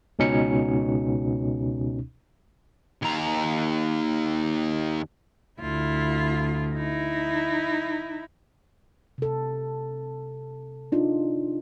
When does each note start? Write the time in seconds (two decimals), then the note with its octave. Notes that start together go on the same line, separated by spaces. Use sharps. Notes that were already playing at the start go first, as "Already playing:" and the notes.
0.19 C#2 B2 C#4 D#4 C#7
3.02 D#2 A#5
5.60 D2 E4 F4
6.74 D#4 E4
9.18 C3 A4
10.92 D4 D#4 F4